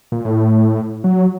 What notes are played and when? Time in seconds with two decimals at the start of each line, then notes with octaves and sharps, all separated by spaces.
0.12 A#2
0.25 A2
1.04 F#3